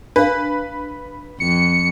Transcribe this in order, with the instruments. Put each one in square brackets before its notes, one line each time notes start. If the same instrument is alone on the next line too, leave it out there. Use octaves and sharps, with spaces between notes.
[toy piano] D4 F5 [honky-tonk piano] B4
[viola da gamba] F2 [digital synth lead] C#7